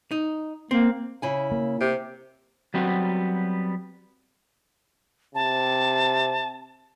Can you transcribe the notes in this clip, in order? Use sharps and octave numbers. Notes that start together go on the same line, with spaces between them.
D#4
A#3 C4
C#3 E4 G#5
A#3
C3
F#3 G3 B3 C4 F#4
C3 A5